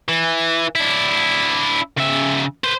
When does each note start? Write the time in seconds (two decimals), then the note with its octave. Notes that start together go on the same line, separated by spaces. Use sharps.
0.09 E3
0.75 D4 E4
1.98 C#3 E5
2.64 B4 C5